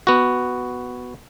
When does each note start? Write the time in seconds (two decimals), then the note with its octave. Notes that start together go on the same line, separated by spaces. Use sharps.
0.07 B3 F#4